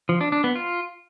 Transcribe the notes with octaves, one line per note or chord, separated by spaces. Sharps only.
F3
D4
D4
B3
F4